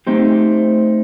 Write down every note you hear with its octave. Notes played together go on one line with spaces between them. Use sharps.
A3 C4 D#4 G4 C5